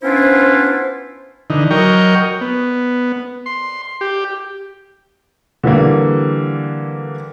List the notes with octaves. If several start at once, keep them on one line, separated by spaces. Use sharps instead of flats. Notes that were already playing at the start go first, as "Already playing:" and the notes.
B3 C#4 D4 E4 F4 C5
D3 E3 D#4
F#3 A#4 D#5 G5 C#6
B3
C6
G4
D3 E3 G3 A#3